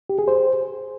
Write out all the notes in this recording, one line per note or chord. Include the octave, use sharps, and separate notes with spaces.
G4
G#4
C5